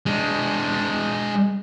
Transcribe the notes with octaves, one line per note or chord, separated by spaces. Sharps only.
G#3 D4